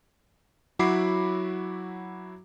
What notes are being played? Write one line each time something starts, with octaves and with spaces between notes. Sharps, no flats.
F#3 E4 F#4 B5 D6 C7